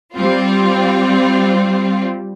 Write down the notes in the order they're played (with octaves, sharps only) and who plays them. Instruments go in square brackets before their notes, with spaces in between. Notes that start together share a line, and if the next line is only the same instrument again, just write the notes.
[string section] G3 C4 F4